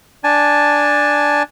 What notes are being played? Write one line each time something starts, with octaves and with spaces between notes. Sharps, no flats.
D4 G#5 A5